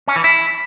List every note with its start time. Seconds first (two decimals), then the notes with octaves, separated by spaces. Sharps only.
0.08 C#4
0.16 E3
0.24 E4